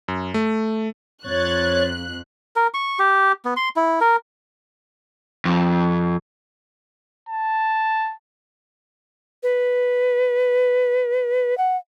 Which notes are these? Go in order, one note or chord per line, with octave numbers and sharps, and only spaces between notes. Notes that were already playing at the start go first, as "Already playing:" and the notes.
F#2
A3
F2 C#5 F#6 G#6 A6
A#4
C#6
G4
B3
C6
E4
A#4
F2
A5
B4
F#5